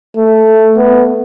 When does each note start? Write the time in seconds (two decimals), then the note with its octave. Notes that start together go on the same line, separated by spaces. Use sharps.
0.16 A3
0.76 B3